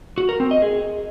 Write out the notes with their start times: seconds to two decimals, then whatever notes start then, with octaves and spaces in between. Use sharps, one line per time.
0.18 F#4
0.29 A#4
0.40 C4
0.51 D#5
0.62 G#4